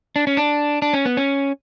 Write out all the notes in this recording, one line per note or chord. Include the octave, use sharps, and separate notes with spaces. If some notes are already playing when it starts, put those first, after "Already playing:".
D4
C#4
D4
D4
C#4
B3
C#4